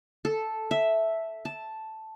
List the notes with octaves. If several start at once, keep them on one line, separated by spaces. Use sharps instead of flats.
A4
E5
A5